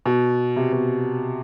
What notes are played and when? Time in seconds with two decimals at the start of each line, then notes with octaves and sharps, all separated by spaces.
0.06 B2
0.56 C3
0.72 B2